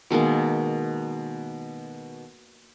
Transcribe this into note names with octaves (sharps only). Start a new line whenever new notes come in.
B2 D#3 G#3 A#3